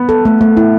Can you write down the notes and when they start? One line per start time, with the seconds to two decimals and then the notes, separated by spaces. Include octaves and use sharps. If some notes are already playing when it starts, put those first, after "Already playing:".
Already playing: B3
0.09 A4
0.25 A3
0.41 A3
0.57 E4